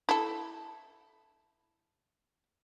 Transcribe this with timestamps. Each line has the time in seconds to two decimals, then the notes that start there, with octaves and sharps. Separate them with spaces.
0.09 E4 A4